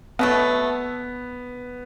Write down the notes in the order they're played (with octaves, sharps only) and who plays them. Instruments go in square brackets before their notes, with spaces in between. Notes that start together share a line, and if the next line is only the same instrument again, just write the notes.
[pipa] B2 F#3 A3 [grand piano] B3